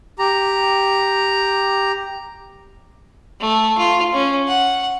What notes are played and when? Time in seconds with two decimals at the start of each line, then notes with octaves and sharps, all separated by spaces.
0.19 G4 A#5
3.40 A3
3.78 F4
4.13 C#4
4.48 F#5